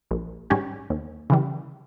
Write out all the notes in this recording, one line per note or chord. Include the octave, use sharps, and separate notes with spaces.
A#1
G#2 G3 C#4 G4
D#2
C#3 E3 G3